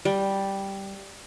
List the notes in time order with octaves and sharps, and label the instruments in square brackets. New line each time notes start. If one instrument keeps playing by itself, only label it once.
[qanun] G3